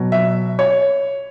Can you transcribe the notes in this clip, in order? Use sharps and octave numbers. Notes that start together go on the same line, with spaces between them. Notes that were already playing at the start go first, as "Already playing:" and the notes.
Already playing: B2 F#3
E5
C#5